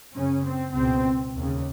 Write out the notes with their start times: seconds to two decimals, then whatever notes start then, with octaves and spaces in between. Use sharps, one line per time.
0.14 F#2 C#3 C#4
0.45 C4
0.75 C#2 B2 C4
1.35 D#2 C#3